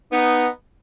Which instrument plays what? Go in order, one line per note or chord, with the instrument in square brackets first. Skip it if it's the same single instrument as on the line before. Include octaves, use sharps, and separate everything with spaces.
[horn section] B3 D#4